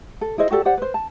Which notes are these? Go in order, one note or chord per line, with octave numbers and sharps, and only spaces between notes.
A4
E4 G#4 C5 D#5
F#4 G4 A4 D5
G4 C5 D5 F#5
B4 C5
A5